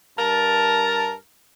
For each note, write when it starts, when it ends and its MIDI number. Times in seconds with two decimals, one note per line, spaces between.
0.18 1.14 43
0.18 1.14 70
0.18 1.14 81